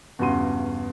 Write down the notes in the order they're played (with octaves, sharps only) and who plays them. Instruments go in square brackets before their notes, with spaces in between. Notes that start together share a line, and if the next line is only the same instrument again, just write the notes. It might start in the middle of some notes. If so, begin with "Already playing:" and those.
[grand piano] E2 G2 C#3 F#4 C6 D#7